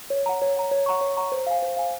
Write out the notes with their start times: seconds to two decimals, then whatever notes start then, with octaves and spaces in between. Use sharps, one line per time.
0.10 C#5
0.26 F#5 A#5
0.42 C#5
0.56 F#5 A#5
0.71 C#5
0.86 F#5 A#5 C#6
1.01 C#5
1.17 F#5 A#5 C#6
1.32 C5
1.47 F5 G#5
1.62 C5
1.77 F5 G#5